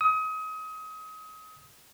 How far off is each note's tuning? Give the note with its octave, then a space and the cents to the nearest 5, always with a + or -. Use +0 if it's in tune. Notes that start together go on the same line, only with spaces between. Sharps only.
D#6 +30